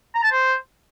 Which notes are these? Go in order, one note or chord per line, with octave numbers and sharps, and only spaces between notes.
A#5
A5
C5